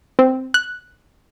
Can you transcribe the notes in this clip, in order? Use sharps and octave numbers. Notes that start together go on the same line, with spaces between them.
C4
F#6